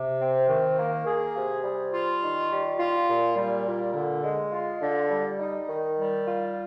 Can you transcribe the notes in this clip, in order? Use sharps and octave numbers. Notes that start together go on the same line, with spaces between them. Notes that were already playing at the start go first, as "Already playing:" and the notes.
Already playing: C3
C4
D#3
A#3
G#4
C3
G3
F4
D#3
G3
F4
A#2
G3
A#2
D3
G#3
F4
D3
G3
D#4
D#3
G3
F4